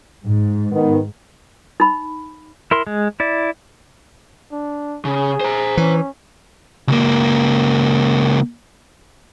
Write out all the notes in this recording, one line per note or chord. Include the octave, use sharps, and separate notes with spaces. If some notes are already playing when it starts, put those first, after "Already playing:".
G#2
D#3 B3
D#4 B5
E4 A#4 C6
G#3
E4 D5
D4
C#3 G#4
C5 A#5
E3 C#4
C#2 A#3